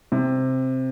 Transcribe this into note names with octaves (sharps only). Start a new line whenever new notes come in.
C3